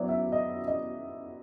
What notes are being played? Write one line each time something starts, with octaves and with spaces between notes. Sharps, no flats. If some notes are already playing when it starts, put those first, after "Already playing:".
Already playing: F#3 B3 E4 D5
E5
D#5
D#5